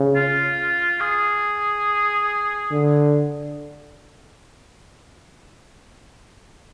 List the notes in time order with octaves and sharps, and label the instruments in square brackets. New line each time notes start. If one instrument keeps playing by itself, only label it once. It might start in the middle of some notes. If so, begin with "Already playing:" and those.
Already playing: [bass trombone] C#3
[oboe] F4
G#4
[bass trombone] D3